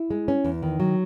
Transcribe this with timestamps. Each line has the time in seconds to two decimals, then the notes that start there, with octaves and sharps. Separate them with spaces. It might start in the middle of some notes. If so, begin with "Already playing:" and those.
Already playing: E4
0.11 G#3
0.28 C#4
0.44 E2
0.62 D#3
0.80 F#3